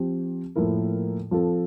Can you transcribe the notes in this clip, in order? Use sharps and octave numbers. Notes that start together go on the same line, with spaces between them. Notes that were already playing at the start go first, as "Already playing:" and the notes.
Already playing: F3 C4 G4
A2 F3 A#3 E4 A#4
F3 C4 F4 A4